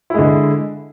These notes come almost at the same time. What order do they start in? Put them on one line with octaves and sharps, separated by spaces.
E4 G#3 D3